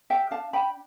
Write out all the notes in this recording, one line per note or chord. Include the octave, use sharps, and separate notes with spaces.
G4 E5 G5
D4 F5 A5
D4 G5 B5